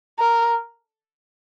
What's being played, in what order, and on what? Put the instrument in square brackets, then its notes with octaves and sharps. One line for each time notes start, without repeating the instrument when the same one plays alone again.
[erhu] A#4